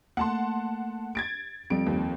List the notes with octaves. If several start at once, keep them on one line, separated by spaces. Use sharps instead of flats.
A3 A#3 F#5 A5 C6
G#6 A6 D7
F2 G3 D7
D#2